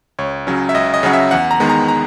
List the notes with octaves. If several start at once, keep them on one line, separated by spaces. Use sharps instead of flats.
C#2 C#5
C#3 F#3 C#4
E5
C#2 D#5
D#5
C#3 F#3 C#4 F#5
E5
E2 F#5
A#5
D#3 G#3 B3
A#5
A#5